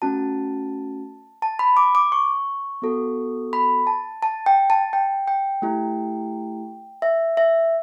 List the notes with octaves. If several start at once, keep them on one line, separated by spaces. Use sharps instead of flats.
A3 C#4 F#4 A5
A5
B5
D6
D6
C#6
B3 F#4 A4
B5
A5
A5
G5
A5
G5
G5
A3 E4 G4
E5
E5